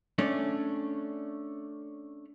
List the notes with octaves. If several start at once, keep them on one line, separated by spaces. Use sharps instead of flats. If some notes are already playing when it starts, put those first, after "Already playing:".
A3 C#4 D4